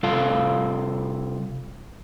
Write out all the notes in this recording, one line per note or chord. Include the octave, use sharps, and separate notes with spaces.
C3 G3 F4 A4 F5 A5